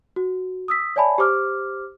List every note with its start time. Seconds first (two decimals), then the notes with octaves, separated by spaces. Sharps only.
0.16 F#4
0.68 D#6 E6 B6
0.96 C#5 D5 E5 G#5 A5 B5
1.18 G4 C5 D6 F6